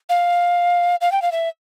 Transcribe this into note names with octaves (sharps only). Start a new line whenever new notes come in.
F5
F5
G5
F5
E5